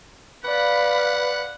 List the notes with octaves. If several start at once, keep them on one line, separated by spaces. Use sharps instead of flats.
B4 D5 F5 F#5 B5